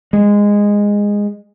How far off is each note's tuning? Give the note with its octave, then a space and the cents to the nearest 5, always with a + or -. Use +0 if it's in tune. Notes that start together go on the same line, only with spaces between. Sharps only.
G#3 -15